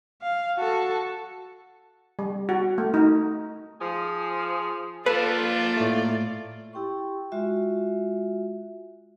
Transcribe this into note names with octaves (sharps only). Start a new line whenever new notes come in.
F5
F#4 A4
G3
F#4
A3
D#4
F3 G#4
A#3 F4 A4 B4 D5 A5
A2 A3
E4 G4 G5 C6 C#6
G#3 F4 F#4 E5